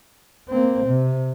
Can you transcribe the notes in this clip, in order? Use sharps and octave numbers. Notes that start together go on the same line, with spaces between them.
A#3 C4
C3